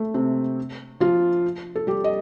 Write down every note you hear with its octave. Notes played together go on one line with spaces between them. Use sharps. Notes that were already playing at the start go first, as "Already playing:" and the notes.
Already playing: A3
C3 C4
F3 F4
A4
G3 G4
D#5